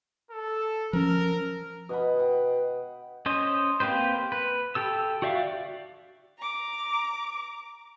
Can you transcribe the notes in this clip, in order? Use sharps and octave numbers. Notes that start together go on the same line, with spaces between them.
A4
F3 C#4 A#4
B2 D#5 F#5 B5
F#5 G5
C#4 C5 D#5
A#3 C4 G4 B4 C5
B4
G4 A4 E6
F#4 G4 D5 E5 F5
A#5 D6